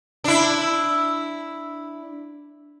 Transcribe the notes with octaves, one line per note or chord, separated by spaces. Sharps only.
D4 E4